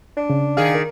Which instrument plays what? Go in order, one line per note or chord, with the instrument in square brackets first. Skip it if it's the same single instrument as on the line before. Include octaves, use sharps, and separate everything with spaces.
[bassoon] D4
[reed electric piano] C#3
[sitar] D#3 G#4 [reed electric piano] F5 G#5
[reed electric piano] A#4